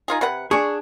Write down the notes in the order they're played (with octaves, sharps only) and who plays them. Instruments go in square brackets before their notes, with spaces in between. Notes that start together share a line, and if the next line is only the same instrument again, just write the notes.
[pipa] D#4 F4 G#4
C3 B4 F#5
[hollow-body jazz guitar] D4 G#4 [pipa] C#6